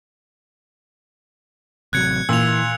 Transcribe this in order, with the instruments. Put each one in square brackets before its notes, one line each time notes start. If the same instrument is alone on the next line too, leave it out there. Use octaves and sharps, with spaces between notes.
[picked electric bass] A1 C3 F#3 [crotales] F#6 G#6 C#7
[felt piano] A#2 [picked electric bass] E3 [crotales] E6 F7